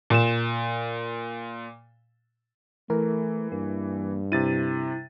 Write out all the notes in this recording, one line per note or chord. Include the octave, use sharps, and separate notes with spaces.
A#2 E7
E3 A3 A#4
G2 A#3
C3 E4 A6 D#7